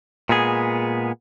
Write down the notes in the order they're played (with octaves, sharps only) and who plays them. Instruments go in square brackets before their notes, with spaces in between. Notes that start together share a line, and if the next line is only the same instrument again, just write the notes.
[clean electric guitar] A#2 G#3 B3 G#4